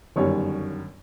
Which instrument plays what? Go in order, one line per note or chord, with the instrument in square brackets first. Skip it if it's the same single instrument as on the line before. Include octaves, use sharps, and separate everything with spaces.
[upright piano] G1 F#2 D#3 G3 C#5